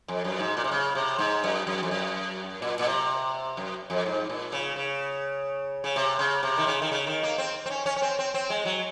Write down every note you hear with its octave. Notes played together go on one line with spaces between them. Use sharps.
F2
F#2
G#2
A#2
C3
C#3
C3
G#2
F#2
F#2
F2
F#2
A#2
A#2
C3
F#2
F2
G#2
A#2
C#3
C#3
C#3
C3
C#3
C3
D#3
C#3
D#3
C#3
D#3
A#3
C4
C4
C#4
C#4
C#4
C4
C4
C4
G#3
F#3